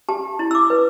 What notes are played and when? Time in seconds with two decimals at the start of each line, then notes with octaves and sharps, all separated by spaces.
0.09 G4 A5
0.39 E4
0.51 E6
0.55 D6
0.70 B4